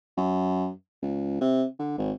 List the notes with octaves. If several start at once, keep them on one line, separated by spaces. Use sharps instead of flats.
F#2
C#2
C3
D3
G#1